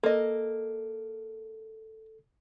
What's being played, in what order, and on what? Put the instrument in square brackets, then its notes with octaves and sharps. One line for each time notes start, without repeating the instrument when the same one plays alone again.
[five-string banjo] A#3 D#5 [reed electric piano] A4